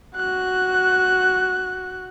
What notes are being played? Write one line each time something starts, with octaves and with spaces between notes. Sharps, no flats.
F#4 F#6